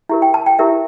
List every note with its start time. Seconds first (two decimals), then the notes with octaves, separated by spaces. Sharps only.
0.09 E4 G4 A#4 E5
0.22 G5
0.34 A5
0.46 G5
0.59 E4 G4 A#4 E5